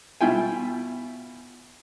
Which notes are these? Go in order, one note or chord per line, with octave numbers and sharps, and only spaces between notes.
B2 E4 F4 G5 G#5